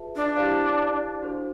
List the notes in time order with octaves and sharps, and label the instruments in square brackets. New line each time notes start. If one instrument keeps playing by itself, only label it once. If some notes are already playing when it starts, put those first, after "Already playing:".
Already playing: [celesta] F4 G#4 B4 E5 A5
[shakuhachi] D4
[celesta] E4 G4 C5 F5
D4 F#4 A4 C5